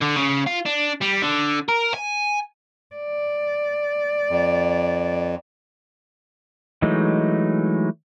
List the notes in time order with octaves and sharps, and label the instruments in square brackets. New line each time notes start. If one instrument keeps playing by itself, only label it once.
[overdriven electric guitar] D3
C#3
F4
D4
G3
D3
A#4
G#5
[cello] D5
[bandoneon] F2
[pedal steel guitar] E3 F#3 G#3 A3 D#4